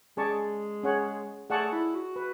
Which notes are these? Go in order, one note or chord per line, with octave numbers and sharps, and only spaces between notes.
G#3 C#4 G#4 D5 A5 C#6
C#4 G#4 C#5 F#5
A3 G#4 D5 F#5 A5 C#6
E4
F#4
B4